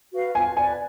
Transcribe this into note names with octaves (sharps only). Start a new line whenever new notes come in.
F#4 B4 F5
F4 G#5
B4 D5 G#5